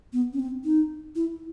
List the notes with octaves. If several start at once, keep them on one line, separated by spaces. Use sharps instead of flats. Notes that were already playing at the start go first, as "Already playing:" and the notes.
B3
C#4
C4
D#4
E4